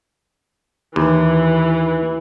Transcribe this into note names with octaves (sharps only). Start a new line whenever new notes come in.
D#2 E3